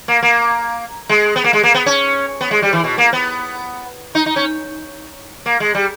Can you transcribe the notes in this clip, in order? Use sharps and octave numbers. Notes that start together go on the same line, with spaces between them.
A#3
A#3
G#3
B3
A#3
G#3
A#3
B3
C#4
B3
G#3
G3
E3
B2
A#3
B3
D#4
D#4
C#4
A#3
G#3
G3